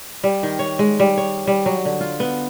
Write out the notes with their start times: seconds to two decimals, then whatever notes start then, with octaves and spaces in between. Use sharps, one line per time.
0.24 G3
0.43 D#3
0.59 C#5
0.79 G#3
1.00 G3
1.17 C#5
1.47 G3
1.66 F#3
1.85 D3
2.01 F4
2.20 B3